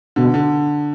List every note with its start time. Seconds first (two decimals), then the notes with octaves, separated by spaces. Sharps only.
0.16 B2 D3
0.34 D3